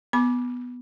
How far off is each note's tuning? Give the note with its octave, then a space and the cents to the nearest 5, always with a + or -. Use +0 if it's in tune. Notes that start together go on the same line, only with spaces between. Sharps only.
B3 +0 B5 -30 D6 +0